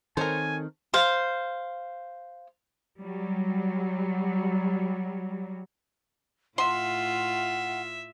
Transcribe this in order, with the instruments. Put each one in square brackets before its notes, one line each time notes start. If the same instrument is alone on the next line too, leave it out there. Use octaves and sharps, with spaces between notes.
[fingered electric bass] D#3 C4 [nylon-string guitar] A4 C#5 [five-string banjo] A#4 C5 [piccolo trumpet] G#5
[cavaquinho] C5 F5
[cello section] F#3 G3
[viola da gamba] A2 F4 [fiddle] E5 [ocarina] F#5 [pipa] C6